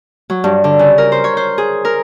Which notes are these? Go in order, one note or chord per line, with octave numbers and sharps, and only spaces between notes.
F#3
G2
D3
C#3
A#4
C5
C#5
C5
G#4
A#4